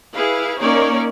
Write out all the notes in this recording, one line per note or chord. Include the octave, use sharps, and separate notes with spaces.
E4 G#4 B4 F5
A#3 C#4 D#4 A#4 C#5 D5